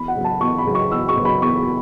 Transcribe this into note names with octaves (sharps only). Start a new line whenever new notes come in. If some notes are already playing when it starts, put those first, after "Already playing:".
Already playing: E2 B5
F#5
C#3 F#3 B3
A5
E2 C#6
B5
C#3 F#3 B3
C#6
E2 E6
C#6
C#3 F#3 B3
B5
E2 C#6